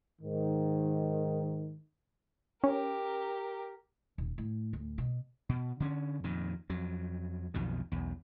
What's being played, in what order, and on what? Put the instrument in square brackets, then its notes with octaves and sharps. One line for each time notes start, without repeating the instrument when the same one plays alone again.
[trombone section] G#2 D#3
[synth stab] C#4 [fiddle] G4 A#4
[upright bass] D#1
A2
D2
B2
[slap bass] B2
D3 C#4
F2 A#2 D#3
F2 F#3
B1 F2 B2 D#3
B1 E2